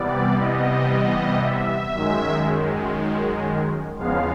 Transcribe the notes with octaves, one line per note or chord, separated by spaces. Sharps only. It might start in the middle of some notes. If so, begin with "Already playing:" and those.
Already playing: C3 E3 G3 B3 D5
D#5
D#5
E5
F#2 D#3 G#3
E2 C#3 F3 G#3 B3 F5